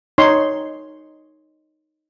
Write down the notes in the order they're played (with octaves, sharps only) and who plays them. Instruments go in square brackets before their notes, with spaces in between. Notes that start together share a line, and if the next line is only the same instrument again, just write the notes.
[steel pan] D#4 C#5 C6